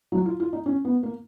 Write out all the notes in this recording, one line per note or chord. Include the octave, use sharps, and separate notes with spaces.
F#3
F4
F4
D#4
C#4
B3
A#3